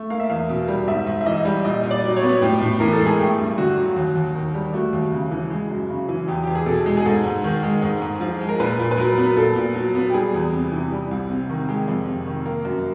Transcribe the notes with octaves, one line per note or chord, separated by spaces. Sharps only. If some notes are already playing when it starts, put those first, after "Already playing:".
Already playing: A3
A#3 F5
E5
E2 F5
B2
G3
G#2 E5
G#2
E5
E3 D#5
G3
A#2 D#5
A#2
D5
F#3
C#5
B3
A2 G4
A2
E3 A#4
A4
G#3
G#4
A3 G4
G2
D3 F#4
F#3
D#2
D#2
D#3
G3
A3 F#4
D#2
C#3
E3
G#3
F#2
C#3
E3
E2 G4
E2 G4
G#4
B2 A4
G#3
G#4
G#2 A4
G#2
D#3
G#3
G#2
G#2
F3
G#3
A#4
A#2 B4
A#2
B4
F#3 A#4
B3
A#2 A4
A#2
F#3
B3
G4
G3 G#4
E2
C3
E3
G3
C2
C3
D#3
G#3 G4
F2
C3
D#3
A#3
F#2